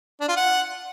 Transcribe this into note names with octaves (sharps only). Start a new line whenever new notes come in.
D4
F4
F#5